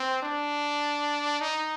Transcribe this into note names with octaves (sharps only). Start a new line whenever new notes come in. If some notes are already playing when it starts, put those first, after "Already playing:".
Already playing: C4
D4
D#4